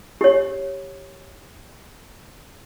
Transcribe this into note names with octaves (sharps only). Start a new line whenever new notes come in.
G4 C#5